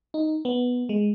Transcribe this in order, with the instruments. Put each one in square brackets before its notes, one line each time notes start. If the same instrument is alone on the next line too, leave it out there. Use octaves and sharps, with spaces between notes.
[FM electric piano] D#4
B3
G#3